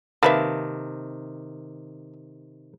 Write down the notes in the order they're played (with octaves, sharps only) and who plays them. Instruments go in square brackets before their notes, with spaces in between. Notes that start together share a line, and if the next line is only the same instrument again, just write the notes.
[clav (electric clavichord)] C3 D#3 A5 [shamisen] A#3 B4 E5